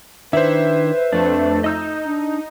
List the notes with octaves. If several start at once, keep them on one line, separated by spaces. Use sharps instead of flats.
D#3 D4 E4 B4 C5 E5
F2 A3 D4
D#4 D#5 E6 G6
D4